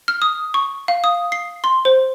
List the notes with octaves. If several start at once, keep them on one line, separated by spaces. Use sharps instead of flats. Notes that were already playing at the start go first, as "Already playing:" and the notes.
F6
D#6
C#6
F5
D#6
C7
C6
C5